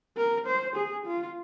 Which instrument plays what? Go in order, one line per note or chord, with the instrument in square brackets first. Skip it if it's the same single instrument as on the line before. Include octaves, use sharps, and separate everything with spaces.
[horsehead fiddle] A#4
C5
G#4
F4